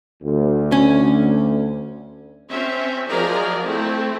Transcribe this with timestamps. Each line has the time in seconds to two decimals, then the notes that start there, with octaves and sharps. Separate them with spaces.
0.23 D2
0.72 C#4
2.49 C4 C#4 E5
3.08 F3 F#3 G#4 A#4 D5 D#5
3.63 A3 C4 E4